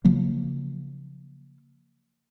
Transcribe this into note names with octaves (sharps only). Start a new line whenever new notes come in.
C#3 F3 F#3 A#3